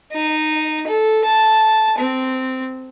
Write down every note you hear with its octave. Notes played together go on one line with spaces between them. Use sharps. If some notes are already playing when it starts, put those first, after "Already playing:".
D#4
A4
A5
C4